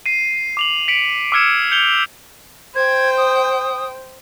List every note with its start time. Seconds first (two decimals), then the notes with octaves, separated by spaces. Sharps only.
0.06 C7 D#7
0.57 D6 F7 F#7
0.88 B6 C#7 D7 F#7
1.32 D6 E6 F6 G#6 C#7 E7
1.71 G6 C#7 F7 G7
2.75 C5 G5 G#6
3.17 D#6